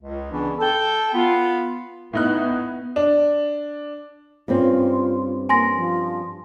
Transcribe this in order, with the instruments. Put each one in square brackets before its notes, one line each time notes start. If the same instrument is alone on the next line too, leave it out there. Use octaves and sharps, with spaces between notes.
[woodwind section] C#2
C#3 E3 B3 C#4 D4
A4 G5
B3 F4
[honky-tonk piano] A2 D#4 F#6 [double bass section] B3
[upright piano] D4
[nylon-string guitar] G2 C4 C#4 [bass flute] F4
[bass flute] A#3 [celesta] G#5 C6 A#6
[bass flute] F3